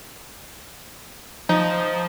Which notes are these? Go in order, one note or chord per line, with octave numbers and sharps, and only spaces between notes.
F3 D#4